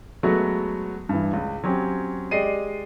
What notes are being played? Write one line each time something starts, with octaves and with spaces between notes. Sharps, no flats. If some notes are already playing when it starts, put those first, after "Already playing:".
F#3 G#3 A3 B3 F#4
G2 E3
C#2
F#3 C4 C#4 G4
G#3 G4 D5 D#5 C7 D#7